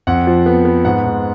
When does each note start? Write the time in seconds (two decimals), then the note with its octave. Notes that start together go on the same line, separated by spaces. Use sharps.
0.07 F2 F#5
0.27 F3
0.46 B3
0.65 B3
0.85 G#2 F#5
1.04 G#2